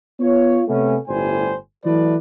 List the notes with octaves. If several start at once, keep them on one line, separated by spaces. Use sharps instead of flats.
B3 F4 C#5
C3 A3 B3 C#4
G1 A2 G3 C5 G#5
E3 F#3 A3 B4 D5